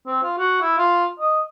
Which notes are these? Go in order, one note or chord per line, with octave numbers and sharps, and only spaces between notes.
C4
F4
F#4
E4
F4
D#5